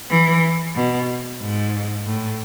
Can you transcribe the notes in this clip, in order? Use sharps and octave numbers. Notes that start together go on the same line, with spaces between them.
E3
B2
G#2
A2